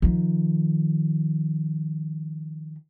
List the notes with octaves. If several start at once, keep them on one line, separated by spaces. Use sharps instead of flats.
D#3 F3